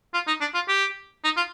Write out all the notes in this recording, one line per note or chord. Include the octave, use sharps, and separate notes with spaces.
F4
D#4
D4
F4
G4
D#4
F4